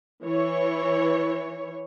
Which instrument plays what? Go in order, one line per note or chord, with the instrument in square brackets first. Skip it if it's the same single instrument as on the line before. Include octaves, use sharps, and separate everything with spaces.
[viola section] E3 C#5